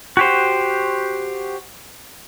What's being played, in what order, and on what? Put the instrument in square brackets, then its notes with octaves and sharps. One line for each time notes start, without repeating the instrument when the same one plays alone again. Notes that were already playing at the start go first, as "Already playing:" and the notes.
[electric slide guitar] F#4 G4 C5